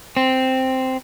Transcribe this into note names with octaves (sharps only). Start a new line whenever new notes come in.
C4